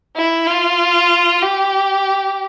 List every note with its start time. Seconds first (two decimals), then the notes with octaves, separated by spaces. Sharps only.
0.17 E4
0.47 F4
1.42 G4